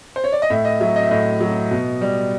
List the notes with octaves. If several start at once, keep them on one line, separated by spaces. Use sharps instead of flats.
C5
C#5
D5
D#5
A2 E5
D#5
F#3 E5
D#5
E5
A2 D#5
F#3
B2
G3